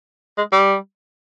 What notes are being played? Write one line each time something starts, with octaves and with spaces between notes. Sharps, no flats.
G#3
G3